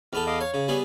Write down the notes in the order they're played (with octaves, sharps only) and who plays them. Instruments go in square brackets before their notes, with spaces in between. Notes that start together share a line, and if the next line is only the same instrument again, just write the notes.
[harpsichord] E2 B3 A4 [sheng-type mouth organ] F6
[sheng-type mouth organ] D#5 F5 D6
[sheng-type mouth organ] C#5 [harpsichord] F5
[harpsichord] C#3
[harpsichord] G3 B3 G#4 [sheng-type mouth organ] C#5